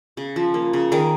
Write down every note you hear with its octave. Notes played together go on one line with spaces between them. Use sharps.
C#3
F3
A#3
C#3
D#3 G#4 A#4